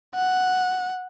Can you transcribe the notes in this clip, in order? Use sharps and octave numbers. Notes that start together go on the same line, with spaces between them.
F#5